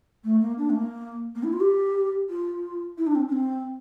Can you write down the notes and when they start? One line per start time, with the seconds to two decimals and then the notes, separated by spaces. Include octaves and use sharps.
0.24 A3
0.41 A#3
0.58 D4
0.70 A3
0.75 A#3
1.35 A#3
1.43 E4
1.53 F4
1.60 G4
2.29 F4
2.98 E4
3.07 D4
3.15 C4
3.28 D4
3.32 C4